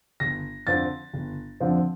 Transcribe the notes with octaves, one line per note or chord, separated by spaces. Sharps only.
G1 A#6
F2 D3 F3 C4 A6
G1
F2 D3 F3 C4